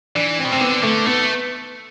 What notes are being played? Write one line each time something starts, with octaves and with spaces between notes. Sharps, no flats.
E3 D4
C4
B2
C3 C4
D3 B3
D3 A3
A3 B3